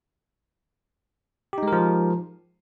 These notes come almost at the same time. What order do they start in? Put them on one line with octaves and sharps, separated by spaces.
G4 D#4 G#3 A#4 F3